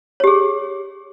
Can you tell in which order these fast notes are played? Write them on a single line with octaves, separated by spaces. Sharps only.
C#5 G4 G#4